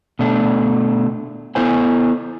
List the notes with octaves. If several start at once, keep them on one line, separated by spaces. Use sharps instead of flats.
B2 A3 D4
B3 E4 A4 C5 G#5